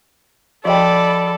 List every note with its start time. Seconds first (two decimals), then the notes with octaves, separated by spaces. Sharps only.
0.65 F3 F#4 A4 D5 D#5 G5 B5